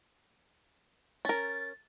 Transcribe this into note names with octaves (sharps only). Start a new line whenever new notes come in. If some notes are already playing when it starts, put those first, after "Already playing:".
C#4 A#4 A6